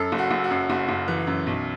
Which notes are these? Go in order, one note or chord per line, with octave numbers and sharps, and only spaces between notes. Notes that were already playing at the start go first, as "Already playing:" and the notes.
Already playing: F#2 A4
F#1
F#4
F#1
F#4
F#2
F#1 F#4
F#1
E3
F#2
B1